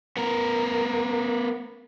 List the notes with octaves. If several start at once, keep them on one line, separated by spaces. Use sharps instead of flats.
B3 A#4